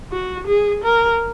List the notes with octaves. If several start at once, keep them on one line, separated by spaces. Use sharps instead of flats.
F#4
G#4
A#4